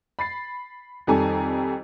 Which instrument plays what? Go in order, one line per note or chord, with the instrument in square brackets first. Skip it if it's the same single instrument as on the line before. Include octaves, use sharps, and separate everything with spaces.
[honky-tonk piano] B5 A6 C7
F2 D#3 G3 A4 G#5 A#5